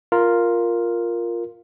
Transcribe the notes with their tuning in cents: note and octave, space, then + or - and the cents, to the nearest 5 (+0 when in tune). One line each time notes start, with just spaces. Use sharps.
F4 +0 A#4 +0